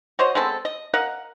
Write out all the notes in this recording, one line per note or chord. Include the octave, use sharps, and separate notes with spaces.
F#4 C5 C#5 D#5
G#3 B3 C4 A4
D#5
A#4 D#5 F5 F#5